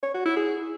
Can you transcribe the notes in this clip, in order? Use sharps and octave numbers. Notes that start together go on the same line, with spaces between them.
C#5
F#4
E4
G#4